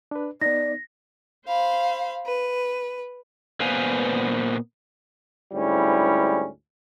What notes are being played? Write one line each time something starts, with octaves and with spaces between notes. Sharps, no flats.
D4 B4
B3 D#4 D5 A#6
C5 F5 B5
B4
A#2 B3 B4 C5 F5 G#5
D2 G#2 G3 C#4 E4